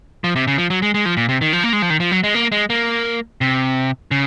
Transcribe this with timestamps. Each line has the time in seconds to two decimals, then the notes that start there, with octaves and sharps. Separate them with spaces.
0.24 F3
0.36 C3
0.47 C#3
0.58 F3
0.70 F#3
0.82 G#3
0.94 G#3
1.05 F3
1.17 A#2
1.29 C3
1.41 D#3
1.53 F3
1.64 A#3
1.73 G#3
1.82 F3
1.90 D#3
2.00 F3
2.11 F#3
2.24 G#3
2.34 A#3
2.52 G#3
2.70 A#3
3.41 C3
4.11 C#3